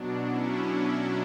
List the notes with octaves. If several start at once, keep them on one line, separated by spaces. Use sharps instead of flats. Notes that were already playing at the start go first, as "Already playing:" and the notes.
Already playing: B2 F#3 D4
C#4 E4